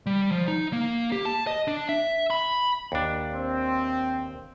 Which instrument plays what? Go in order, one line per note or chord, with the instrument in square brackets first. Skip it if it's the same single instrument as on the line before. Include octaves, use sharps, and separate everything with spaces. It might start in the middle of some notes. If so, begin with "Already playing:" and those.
[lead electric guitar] G3
F3
D#4
A#3
G4
A5
D#5
D4
E5
B5
[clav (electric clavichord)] D#2 D4
[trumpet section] C4